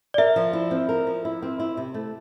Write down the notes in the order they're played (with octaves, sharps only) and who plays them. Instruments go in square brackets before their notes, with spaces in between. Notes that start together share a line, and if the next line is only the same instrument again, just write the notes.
[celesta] D5
[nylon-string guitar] A#4 [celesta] E5
[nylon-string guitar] F3
E4
C4
A#4
F3
E4
C4
E4
C3
A3